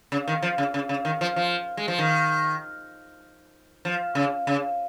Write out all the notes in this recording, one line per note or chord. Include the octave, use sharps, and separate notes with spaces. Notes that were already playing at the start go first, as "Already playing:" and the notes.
C#3
D#3
F3
C#3
C#3
C#3
D#3
F3
F3
G#3
F3
D#3
F3
C#3
C#3